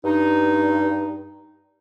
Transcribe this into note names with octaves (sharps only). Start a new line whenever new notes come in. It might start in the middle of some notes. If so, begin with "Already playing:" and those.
G2 D#4